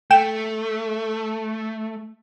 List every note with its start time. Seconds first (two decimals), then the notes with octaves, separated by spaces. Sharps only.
0.11 A3 G5 E7